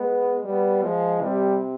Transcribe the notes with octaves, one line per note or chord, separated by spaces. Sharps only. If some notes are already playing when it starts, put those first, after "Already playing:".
Already playing: G#3 B3
G3 B3
F3 G#3
C3 G3